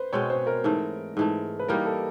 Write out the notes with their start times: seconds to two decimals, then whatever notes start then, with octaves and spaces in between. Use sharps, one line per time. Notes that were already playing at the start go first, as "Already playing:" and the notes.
Already playing: B4 C5
0.13 B2 G#3 C4 C#5
0.30 C5
0.47 A#4
0.64 G#2 E3 A3
1.17 G#2 E3 A3
1.59 B4
1.68 E3 G3 A#3 D#4 A#4
1.86 A4